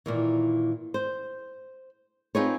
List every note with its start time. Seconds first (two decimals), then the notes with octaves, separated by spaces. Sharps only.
0.06 A#2 D#3 E3
0.94 C5
2.35 C4 D#4 F4 G#4 B4 C#5